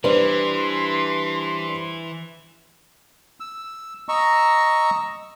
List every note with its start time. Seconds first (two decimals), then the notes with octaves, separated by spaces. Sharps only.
0.04 E3 G3 D4 B4 C5 C6
3.40 E6
4.09 D#5 A#5 C#6 E6